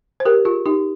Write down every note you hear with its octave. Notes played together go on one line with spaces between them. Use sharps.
C5
G4 A#4
F4 G#4
D#4 G4